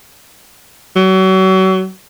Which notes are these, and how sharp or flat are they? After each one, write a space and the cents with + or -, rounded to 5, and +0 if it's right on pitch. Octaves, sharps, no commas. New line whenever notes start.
F#3 +35